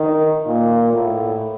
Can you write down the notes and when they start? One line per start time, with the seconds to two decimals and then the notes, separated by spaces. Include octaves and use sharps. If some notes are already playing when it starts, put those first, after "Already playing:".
Already playing: D#3
0.46 A#2
0.93 A2